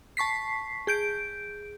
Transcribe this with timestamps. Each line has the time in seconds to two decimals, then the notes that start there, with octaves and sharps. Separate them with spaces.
0.17 A5 C#6 B6 C7
0.87 G#4 G6 D7